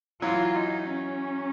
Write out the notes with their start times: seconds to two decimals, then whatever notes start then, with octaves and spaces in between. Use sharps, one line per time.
0.22 E3 F#3 F4
0.55 D#4
0.89 C#4